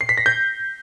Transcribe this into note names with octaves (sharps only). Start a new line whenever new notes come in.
C7
B6
A#6
G6